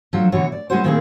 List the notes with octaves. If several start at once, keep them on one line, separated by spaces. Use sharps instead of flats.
F3 F#3 D4 A4
B2 D3 E3 F#4 C#5
D5
G#3 B3 C#4 E4 F#4 C5
A#2 D#3 A#3 C4 E4 G#4